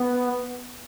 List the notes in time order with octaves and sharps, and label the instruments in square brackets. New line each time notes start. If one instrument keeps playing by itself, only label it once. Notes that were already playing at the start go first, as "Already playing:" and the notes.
Already playing: [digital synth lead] B3